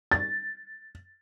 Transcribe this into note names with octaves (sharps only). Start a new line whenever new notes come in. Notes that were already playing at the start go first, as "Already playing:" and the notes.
A6